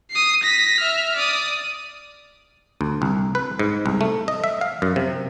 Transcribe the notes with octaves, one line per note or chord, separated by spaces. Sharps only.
D#6 C7
A#6 B6
E5 F6
D5 D#6
D2
C2
B4
G#2
C2
A3
D#5
E5
F5
F#2
C3